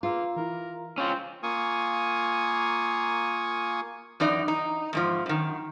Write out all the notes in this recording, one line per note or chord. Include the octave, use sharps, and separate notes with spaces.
A#3 F4 G#4 B4 E6
E3 E4 A#4
C4 C#4 F4
A#3 F4 G#5 C#6 D#6
F#2 E3 D#4 D5
D#4
E2 G#2 F3
F#2 D#3